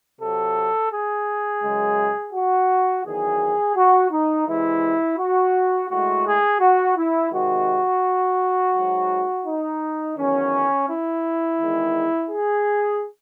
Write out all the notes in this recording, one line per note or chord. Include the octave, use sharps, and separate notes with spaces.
C3 F#3 A4
G#4
F#2 C#3 G#3
F#4
E2 D#3 F#3 G#4
F#4
D#4
C3 E3 G#3 E4
F#4
A2 G#3 F#4
G#4
F#4
E4
C3 D#3 G#3 F#4
G#2 F#3
D#4
E2 D#3 F#3 C#4
E4
E2 D#3 G#3
G#4